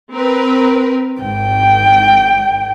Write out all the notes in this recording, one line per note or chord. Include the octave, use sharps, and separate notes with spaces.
C4 A#4 B4
G#1 G5